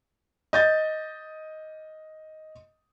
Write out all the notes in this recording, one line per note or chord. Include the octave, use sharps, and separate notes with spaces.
D#5 G6 A6